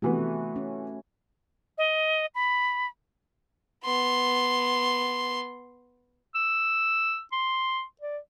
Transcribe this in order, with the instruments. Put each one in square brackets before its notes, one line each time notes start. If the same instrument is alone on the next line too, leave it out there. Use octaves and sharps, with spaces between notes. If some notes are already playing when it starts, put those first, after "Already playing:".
[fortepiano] C3 E3 B3 [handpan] A3 F#4
[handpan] C#4
[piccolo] D#5
B5
[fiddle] B3 C6
[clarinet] E6
C6
D5